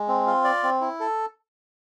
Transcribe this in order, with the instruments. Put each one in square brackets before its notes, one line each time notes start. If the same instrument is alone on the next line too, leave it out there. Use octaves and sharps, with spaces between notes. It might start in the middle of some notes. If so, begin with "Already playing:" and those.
Already playing: [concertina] G#3
C4
F4
D5
C4
E4
A4